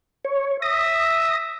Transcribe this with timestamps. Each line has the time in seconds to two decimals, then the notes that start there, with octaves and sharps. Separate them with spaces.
0.25 C#5
0.62 E5 D#6 A#6